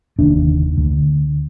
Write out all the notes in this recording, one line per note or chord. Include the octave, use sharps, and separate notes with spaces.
F1 D#2 D3 D4
D2 D3